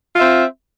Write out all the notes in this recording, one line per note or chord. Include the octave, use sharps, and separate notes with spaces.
C4 F4 E5